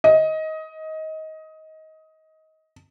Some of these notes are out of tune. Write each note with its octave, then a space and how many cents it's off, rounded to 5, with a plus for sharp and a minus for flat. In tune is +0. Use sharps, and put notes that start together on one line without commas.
D#5 +20